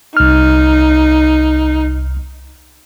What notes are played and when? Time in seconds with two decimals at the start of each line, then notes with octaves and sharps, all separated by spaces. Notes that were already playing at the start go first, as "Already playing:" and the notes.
0.17 C2 D#4 F6